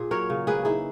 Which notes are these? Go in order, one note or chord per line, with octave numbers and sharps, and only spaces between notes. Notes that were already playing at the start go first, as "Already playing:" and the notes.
Already playing: A#2 G#4
F#3 A#4 C#5
C#3
A#3 G#4 B4
D#4 E4 G#4